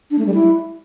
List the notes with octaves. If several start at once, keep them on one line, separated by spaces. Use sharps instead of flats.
D4
A3
G3
E4